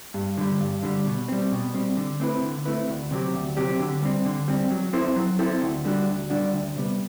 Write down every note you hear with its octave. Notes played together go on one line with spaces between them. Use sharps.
G2
D3 G3
G2
D3 G3
B2
G3 C4
B2
G3 C4
D3
A3 C4 E4 B4
D3
A3 C4 E4 B4
D2
C3 F#3 C4 G4
D2
C3 F#3 C4 G4
D3
G3 C4
D3
G3 C4
F#3
C4 E4 A4 C5
F#3
C4 E4 A4 C5
D2
D3 G3 D4 F#4
D2
D3 G3 D4 F#4
D2
C3 G3 B3